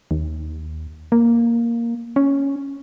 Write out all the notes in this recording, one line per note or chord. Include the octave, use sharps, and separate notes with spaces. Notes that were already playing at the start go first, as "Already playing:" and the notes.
D#2
A#3
C#4